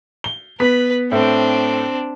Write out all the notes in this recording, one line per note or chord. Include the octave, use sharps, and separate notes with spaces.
G7
B3 B4 B6
A2 C4 D4